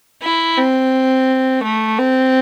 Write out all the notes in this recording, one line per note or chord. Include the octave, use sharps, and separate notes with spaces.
E4
C4
A3
C4